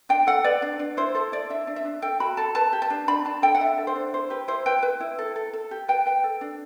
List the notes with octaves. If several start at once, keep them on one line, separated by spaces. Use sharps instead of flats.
D4 G5
A4 F#5
B4 D5
D4
D4
E4 C5
A4 C5
E4 D5
D4 E5
D4
E5
D4
A4 G5
F#4 B5
A4 A5
B4 A5
G4
A5
D4
D4 B5
D4 A5
A4 G5
F#5
D4 E5
A4
C5
D4
E4 C5
G4 B4
E4 C5
B4 G5
B4
E4
A4
A4
A4
G4
B4 G5
B4 G5
A4
D4